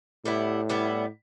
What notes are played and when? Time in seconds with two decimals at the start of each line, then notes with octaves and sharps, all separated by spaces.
0.25 A2 G3 B3 E4
0.70 G3 B3 E4